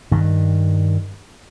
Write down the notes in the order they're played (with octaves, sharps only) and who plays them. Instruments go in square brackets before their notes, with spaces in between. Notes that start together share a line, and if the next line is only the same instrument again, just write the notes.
[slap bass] G2 D#3